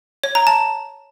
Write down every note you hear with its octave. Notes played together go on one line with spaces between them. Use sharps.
C#5
A#5
A5